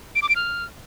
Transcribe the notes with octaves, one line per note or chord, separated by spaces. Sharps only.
D7
D6
D7
F6